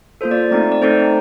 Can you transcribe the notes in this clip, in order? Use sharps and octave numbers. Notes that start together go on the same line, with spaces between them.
A#3 F4 A4 C5
D5
A3 C4 D#4 A4 D5
D5
A3 C4 D#4 A4 C5